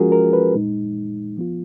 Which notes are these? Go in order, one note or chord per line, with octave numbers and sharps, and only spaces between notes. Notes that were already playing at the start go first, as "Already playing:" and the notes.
Already playing: F3 G#3 C#4 F4 F#4 G#4 A#4
A#4
B4
A#2 G#3 D#4
F3 B3 F4